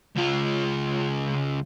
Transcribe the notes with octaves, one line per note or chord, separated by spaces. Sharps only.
C#2 F4